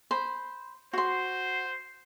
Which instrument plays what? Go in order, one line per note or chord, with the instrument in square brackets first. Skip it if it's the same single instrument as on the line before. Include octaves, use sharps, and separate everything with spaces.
[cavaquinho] C5 B5
[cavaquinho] F#4 C6 [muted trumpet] C5